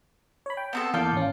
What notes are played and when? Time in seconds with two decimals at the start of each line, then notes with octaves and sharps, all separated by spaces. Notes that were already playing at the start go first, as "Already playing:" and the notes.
0.46 C#5 B5
0.57 G5
0.73 B3 C4 A4
0.94 E2 A#3 F4 A4 D5 G6
1.13 G#1 C#4